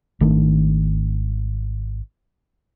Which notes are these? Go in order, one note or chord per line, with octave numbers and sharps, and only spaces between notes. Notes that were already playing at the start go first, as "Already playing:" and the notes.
G#1 D#3 A3 D4